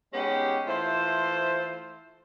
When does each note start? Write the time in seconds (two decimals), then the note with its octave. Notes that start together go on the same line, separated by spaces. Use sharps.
0.13 G#3 B3 C#4 D#4 G4
0.66 E3 A3 F4 C5